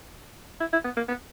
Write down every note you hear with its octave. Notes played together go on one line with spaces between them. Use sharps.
E4
E4
B3
A#3
B3